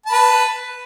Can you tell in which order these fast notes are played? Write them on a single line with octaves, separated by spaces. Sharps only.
A5 B5 B4